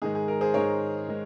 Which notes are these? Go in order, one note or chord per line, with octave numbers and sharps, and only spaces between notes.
G#2 D#3 G#3 G#4
G#4
A#4
G#4 C5
G#2 D#3 G#3 A#4 C#5
D#3 G#3